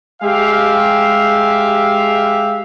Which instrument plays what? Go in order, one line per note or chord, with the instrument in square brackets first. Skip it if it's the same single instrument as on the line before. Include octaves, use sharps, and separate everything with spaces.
[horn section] G#3 G4 E5 F5